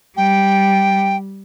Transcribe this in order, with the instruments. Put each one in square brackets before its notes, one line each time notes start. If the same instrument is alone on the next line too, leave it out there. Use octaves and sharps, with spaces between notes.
[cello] G3 [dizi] G5